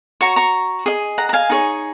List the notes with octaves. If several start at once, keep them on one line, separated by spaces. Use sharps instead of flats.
F#4 C#5 A#5 C#6
A#5 C#6
G#4 D#5
F#5 A#5
A#5
F5 G#5
D#4 G#4 C#5